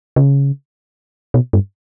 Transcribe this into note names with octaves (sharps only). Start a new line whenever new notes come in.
C#3
B2
G2